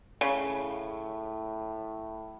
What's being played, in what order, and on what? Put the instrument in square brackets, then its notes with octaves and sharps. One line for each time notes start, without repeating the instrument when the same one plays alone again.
[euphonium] A2 [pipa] C#3